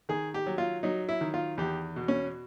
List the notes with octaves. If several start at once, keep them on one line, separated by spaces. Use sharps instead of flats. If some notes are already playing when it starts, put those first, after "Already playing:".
D#3 G#4
G4
F#3
F4
F#3 D#4
E4
D#3
F4
E2 G4
B2
C#4